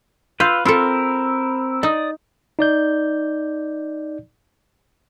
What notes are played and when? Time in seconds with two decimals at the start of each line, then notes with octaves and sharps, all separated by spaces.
0.40 F4 B4 F5 E6 G6
0.65 C4 F4 A4 A#4 B5 E6
1.83 D#4 D5 D#6
2.59 D#4 D5 G6